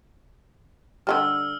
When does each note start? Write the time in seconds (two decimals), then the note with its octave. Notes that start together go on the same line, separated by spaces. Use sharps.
1.07 D3 F#3 G3 E6 F6